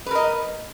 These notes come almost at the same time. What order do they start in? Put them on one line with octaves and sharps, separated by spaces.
B4 A#4 D#5